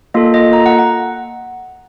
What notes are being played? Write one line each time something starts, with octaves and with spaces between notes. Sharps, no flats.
A#3 F4 A4 D#5
D#5
A#5
F#5
F#5